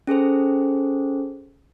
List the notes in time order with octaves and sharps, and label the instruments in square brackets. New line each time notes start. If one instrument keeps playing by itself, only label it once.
[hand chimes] C#4 G#4 A4 C5